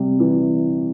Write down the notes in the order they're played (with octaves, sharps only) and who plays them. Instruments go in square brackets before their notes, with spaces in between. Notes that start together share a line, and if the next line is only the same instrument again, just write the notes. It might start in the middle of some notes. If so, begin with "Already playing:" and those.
Already playing: [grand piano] C3 G3
E3